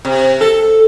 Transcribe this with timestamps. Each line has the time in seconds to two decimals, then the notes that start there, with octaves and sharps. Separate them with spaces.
0.05 C3
0.41 A4